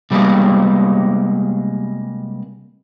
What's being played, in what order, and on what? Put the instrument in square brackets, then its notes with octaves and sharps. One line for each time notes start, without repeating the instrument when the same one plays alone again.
[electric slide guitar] C3 G3 G#3 A#3 B3